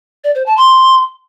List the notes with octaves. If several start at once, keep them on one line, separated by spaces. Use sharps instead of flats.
D5
C5
A5
C6